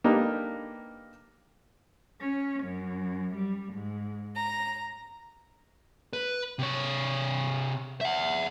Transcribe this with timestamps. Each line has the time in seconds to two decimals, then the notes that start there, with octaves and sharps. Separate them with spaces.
0.04 A#3 D4 D#4 G4 A4 B4
2.20 C#4
2.63 F#2
3.35 G3
3.74 G#2
4.36 A#5
6.13 B4
6.59 C3 C#5
8.01 E5 F#5